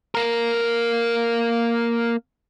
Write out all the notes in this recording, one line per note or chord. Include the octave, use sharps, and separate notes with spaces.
A#3 A#4